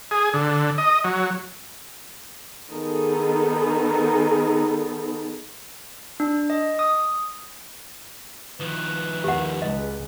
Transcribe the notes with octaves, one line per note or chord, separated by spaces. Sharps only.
G#4
D3
D#5
F#3
D#3 B3 D#4 G#4 A4
D4
D#5
D#6
D#3 F3 B4
D#2 G4 F#5
C#2 D#5